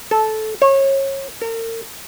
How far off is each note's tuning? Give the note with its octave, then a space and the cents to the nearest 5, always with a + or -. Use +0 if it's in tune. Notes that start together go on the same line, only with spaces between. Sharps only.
A4 -15
C#5 -30
A#4 -40